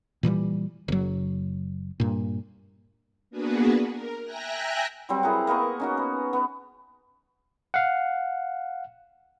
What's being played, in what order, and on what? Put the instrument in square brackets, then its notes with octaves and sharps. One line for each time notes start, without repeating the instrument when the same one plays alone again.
[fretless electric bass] A#2 E3 F#3 G3
F#1 F#3
G2 A#2
[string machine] A#3 B3 D4 F#4 G#4 B4
A#4
E5 G5 G#5 A#5 F#6 A#6
[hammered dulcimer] F#3 G3 C4
E4 G#4 A#4 F#5
A#3 B3 D#5 C#6
C#4 D#4 F#4
B3
B3
[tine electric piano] F5 F#5